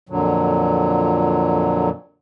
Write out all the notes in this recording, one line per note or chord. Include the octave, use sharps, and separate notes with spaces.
F2 A#2 D3 F#3